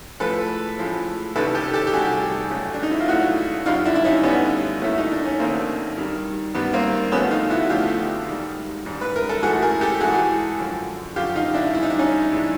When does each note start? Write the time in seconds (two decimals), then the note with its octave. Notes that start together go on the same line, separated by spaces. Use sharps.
0.20 A2 F3 G#3 A4 B4
0.78 A2 F3 G#3
1.35 C2 C3 D#3 G3 A4 B4
1.55 G4 A4
1.74 G4 A4
1.87 G4
1.93 C2 C3 D#3 G3 F#4 G#4
2.50 C#2 C#3 F#3 A3
2.74 D4
2.83 D#4
2.91 E4
3.00 F4
3.08 C#2 C#3 F#3 A3 E4 F#4
3.66 F#2 D3 G3 D#4 F4
3.85 D4 E4
3.95 E4
4.04 C#4 D#4
4.23 F#2 D3 G3 B3 C#4
4.81 D#2 D#3 F#3 A3 E4
4.98 D#4
5.12 D4
5.25 C#4
5.39 D#2 D#3 F#3 A3 A#3 C4
5.97 G2 D#3 G3
6.55 G2 D#3 G3 B3
6.74 A#3 C4
7.12 D2 D3 F3 A3 B3 C#4
7.31 D#4 F4
7.50 E4 F#4
7.70 D2 D3 F3 A3 F4 G4
8.28 G#2 D#3 G3
8.85 G#2 D#3 G3
9.01 B4
9.16 A#4
9.29 A4
9.43 G#2 E3 A3 F#4 G#4
9.62 G#4 A#4
9.81 G4 A4
10.00 G#2 E3 A3 F#4 G#4
10.59 F#2 D3 F3
11.16 F#2 D3 F3 F4 G4
11.35 D#4 F4
11.54 D4 E4
11.73 G2 E3 G#3 E4
11.83 D#4
11.90 D4
11.99 C#4 D#4
12.32 G2 E3 G#3